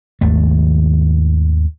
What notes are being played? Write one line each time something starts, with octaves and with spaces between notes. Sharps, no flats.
G#1 D#2 A3